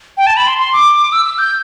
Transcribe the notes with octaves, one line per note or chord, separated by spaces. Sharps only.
G5
A5
B5
C6
C6
D6
E6
E6
G6